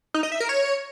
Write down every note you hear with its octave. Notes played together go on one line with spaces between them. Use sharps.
D#4
D#5
E5
A#4
C#5